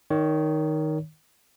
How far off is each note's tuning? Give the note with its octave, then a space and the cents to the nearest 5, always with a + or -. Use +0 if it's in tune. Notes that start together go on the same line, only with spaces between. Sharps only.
D#3 +0 C#5 +25